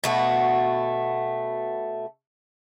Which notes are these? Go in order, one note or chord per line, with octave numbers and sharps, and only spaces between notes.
B2 A3 F#4